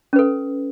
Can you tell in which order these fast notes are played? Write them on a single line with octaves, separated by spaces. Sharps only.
C#4 B4 A4